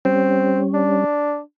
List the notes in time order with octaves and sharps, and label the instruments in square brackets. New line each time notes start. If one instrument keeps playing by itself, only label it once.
[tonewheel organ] G3 C#4 [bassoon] C4
[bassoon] D4